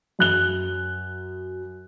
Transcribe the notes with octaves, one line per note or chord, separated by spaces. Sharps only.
F#2 F#6 G7